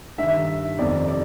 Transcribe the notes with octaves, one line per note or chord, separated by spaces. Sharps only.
G2 D#3 E5
F2 C3 D#3 D5
D5